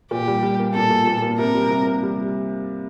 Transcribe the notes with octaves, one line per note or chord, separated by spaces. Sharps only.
A#2 G4
G3
G3
A#3
A#2 A4
A#2
A#2
A#3
C3 A#4
G3
C3
A#3
G3